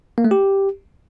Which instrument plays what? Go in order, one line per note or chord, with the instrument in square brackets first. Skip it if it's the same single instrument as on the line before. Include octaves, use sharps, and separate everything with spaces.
[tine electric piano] A#3
A3
G4